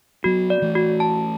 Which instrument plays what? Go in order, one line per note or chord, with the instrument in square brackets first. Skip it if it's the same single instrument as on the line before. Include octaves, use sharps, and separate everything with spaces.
[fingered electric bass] F#3 B3 [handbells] F#4
[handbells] D5
[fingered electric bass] E3 A3
[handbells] F#4
A5